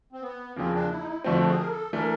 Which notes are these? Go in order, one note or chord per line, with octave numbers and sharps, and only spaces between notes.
C4
B3
E2 C#3 F3 A#3 C4
D4
E4
D#4
E4
F2 D3 F3 A3 C4 F#4
G#4
A#4
A4
E3 A3 D4 A#4